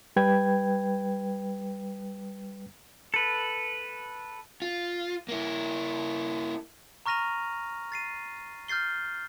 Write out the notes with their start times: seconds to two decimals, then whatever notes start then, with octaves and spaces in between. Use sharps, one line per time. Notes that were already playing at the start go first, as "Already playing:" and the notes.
0.16 G3 B4 G5 G#6
3.14 A4 B4
4.62 F4
5.29 A#3 E4
7.06 A#5 C#6 F6 A#6 D#7 F7
7.92 A6 C7 D#7
8.68 F6 G6 A6 C7 G7